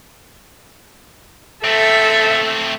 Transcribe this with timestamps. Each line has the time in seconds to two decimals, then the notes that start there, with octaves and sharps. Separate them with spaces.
1.64 A3 C4 A4 E5